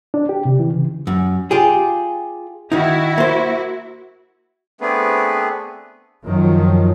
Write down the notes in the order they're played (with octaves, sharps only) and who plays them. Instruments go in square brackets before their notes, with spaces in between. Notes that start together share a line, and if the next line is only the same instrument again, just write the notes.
[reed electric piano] D4
G4
C3
E3
C#3
[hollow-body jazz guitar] F#2
F4 G4 G#4
[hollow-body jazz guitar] D#3 D#4 [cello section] E4 F#4
[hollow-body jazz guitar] A#3 C5
[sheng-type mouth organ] A3 B3 C4 D4 G#4 B4
[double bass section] F#2 D#3 F3 F#3